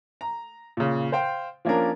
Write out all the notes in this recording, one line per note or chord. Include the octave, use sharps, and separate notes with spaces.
A#5
A#2 C#3
C5 F5 G5
F3 A#3 C#4 D4 A#4